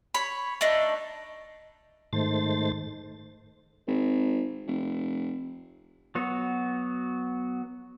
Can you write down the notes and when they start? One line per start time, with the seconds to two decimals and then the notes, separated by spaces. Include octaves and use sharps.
0.14 C#5 B5
0.61 A3 D4 D#4
2.13 G#2 D#3 A3 C5 A6
3.88 G#1
4.67 F1
6.15 F#3 B3 F#4